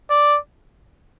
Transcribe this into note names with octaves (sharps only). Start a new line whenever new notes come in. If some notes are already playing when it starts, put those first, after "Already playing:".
D5